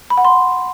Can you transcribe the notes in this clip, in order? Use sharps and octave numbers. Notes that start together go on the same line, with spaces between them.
B5
F#5
C6